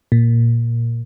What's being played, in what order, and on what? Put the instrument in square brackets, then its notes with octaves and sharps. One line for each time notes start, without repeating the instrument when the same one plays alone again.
[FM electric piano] A#2